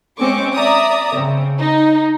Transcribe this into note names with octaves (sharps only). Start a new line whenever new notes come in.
G#3 C4 C#4 C#6 D6
D5 E5 A#5 D#6
C#3 C4
D#4